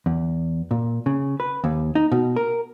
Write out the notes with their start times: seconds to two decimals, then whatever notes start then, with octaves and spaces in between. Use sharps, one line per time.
0.06 E2
0.71 A#2
1.06 C#3
1.40 B4
1.64 D#2
1.95 D#4
2.12 B2
2.36 A#4